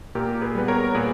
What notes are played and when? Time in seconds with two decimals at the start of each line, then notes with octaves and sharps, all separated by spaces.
0.15 A#2 G4 A#4
0.41 G#4 B4
0.55 G3 B3 B4
0.68 A#4 C#5
0.95 A#2 G#4 B4